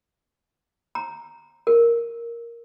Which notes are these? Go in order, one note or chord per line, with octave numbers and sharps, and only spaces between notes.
A#5
A#4